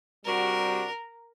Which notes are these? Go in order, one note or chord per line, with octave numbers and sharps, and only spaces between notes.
C3 G3 D4 F#4 A#4